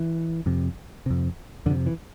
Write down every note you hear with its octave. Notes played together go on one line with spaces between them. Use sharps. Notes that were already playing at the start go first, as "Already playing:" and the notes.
Already playing: E3
F2 C3
F2 C3
F2 C3 D3
E3